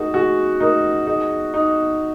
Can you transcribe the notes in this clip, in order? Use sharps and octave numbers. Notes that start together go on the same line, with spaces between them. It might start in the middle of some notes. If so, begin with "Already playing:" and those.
Already playing: D#4 F#4 G#4 A#4
F#4 G#4
D#4 A#4
D#4 G#4
D#4